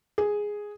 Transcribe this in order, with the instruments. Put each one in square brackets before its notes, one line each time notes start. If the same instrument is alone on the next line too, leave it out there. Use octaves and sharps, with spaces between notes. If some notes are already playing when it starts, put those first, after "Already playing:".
[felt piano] G#4